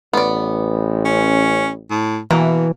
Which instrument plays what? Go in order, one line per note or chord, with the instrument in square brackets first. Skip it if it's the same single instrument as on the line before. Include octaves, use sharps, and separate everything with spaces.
[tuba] A1 [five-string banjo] B3 D5
[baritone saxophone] C#4
A2
[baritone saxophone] B2 [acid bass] E3 [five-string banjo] A#3